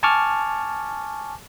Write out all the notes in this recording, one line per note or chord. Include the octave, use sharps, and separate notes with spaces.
G#5 A5 C#6 D6 F6